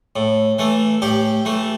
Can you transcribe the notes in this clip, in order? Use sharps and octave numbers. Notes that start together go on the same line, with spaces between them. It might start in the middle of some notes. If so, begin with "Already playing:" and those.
A2
E3 A3
A2 G4
E3 A3